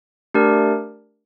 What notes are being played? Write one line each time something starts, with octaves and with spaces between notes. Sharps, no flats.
A3 D4 G4 A#4 D5